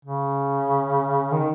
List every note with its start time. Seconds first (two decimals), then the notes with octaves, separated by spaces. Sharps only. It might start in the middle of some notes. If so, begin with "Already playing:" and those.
0.05 C#3
1.32 D#3